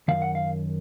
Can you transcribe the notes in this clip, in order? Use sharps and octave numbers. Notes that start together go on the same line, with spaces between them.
F#2 D#3 F5
F#5
F5